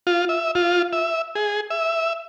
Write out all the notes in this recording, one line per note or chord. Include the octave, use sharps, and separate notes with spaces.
F4
E5
F4
E5
G#4
E5